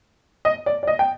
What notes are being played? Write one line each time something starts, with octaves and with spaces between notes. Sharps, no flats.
D#5
D5
D5
D#5
G5